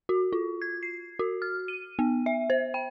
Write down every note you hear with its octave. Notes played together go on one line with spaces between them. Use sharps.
F#4
F4
G#6
C7
F#4
F6
D#7
B3
E5
C5
G5